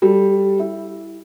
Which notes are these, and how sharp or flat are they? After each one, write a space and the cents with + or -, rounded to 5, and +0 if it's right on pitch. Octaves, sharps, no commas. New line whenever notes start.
G3 +0 A4 +0
E4 +0 E5 +0